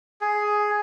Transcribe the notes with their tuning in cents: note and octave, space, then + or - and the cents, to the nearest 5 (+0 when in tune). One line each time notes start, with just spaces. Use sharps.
G#4 +10